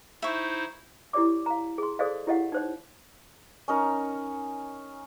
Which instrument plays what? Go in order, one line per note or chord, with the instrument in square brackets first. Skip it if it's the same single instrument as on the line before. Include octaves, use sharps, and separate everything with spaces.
[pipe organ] D#4 E4 C5 [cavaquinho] E5 C#6
[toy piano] E4 G4 C#5 D5 D6
F5 A#5
G#4 C6
G#4 A4 C5 D5 D#5 F5
E4 G4 C#5 D#5 F5 F#5
D#4 C5 C#5
[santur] C#4 D#4 A#4